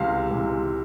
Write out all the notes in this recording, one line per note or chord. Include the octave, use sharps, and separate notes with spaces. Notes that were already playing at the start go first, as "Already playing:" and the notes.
Already playing: C#2 C3 E3 F5
C#2 C3 E3